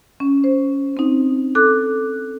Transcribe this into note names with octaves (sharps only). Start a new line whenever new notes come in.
C#4
C5
C4 D#4
A4 D6 F#6